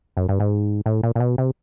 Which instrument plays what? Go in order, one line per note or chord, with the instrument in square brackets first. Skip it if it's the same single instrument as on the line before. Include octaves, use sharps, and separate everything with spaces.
[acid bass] F#2
G2
G#2
A2
A#2
A#2
B2
C3